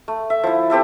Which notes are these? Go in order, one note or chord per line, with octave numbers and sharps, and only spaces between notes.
A3
E5
F3 E4
C4 G4 A4 E5